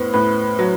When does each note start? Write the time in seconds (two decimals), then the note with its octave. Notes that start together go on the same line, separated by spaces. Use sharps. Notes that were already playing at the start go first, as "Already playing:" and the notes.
Already playing: A2 B3 B4 C5
0.14 A2 B4
0.59 F#3